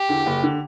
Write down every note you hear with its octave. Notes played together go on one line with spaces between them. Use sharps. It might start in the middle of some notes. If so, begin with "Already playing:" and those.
Already playing: G4
E2 D3
F#1
D3